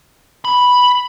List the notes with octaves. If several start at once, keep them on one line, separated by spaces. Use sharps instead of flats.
B5